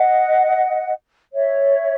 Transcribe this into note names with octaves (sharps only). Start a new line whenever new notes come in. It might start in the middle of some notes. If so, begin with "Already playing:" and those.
Already playing: D#5 F#5
C#5 E5